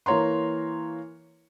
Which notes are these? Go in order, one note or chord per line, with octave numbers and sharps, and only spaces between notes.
E3 A#3 C#5 A#5 C6